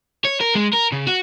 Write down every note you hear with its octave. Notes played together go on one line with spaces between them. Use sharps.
C#5
A#4
G#3
A#4
C#3
F#4